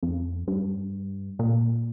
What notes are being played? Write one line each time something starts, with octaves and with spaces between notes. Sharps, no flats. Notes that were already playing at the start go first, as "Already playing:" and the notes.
F2
G2
A#2